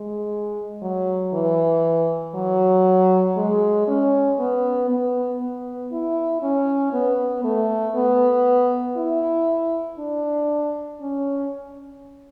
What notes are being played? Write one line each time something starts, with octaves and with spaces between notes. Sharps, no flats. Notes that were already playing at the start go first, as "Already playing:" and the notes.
Already playing: G#3
F#3
E3
F#3
G#3
C#4
B3
B3
B3
E4
C#4
B3
A3
B3
E4
D4
C#4